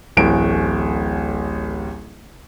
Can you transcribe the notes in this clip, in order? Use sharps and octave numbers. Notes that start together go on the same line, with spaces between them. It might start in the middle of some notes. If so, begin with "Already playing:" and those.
D1 A1 D7